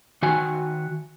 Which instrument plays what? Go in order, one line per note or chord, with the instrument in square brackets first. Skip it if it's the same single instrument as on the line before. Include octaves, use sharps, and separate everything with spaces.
[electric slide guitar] D#3 F#4 G#5